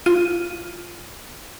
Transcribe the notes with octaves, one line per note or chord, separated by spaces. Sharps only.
F4 D#7